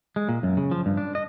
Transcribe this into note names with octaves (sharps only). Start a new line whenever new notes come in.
G#3
A#2
F#2
C#3
F3
G2
D4
D#5